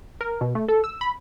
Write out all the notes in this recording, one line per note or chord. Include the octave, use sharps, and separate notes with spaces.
A#4
B2
A3
A4
E6
B5